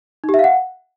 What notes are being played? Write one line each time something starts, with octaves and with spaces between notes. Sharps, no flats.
D#4
G4
E5
F5
F#5